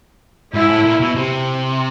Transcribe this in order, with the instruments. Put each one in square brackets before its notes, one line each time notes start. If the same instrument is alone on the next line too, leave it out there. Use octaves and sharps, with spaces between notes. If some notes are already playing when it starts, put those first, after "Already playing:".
[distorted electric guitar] G#2 [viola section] E4
[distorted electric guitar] A2
A#2
B2
C3